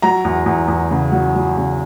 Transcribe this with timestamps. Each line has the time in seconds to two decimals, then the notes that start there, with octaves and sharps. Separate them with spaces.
0.02 F#3 A#5
0.25 E2
0.46 E2
0.68 E2
0.91 C#3
1.12 F#3
1.35 F#3
1.57 C#3